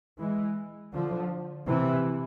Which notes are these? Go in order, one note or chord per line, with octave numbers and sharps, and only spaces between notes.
E3 G#3
D3 F3
C3 E3